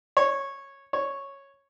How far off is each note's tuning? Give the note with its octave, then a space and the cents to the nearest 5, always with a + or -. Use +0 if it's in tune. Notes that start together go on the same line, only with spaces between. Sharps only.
C#5 -10
C#5 -5